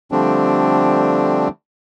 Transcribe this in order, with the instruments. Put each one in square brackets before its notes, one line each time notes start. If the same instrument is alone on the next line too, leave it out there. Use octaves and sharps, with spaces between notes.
[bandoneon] D3 F3 G3 A3 C4 D4